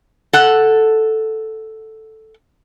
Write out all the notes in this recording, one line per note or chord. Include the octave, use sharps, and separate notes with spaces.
A4 F#5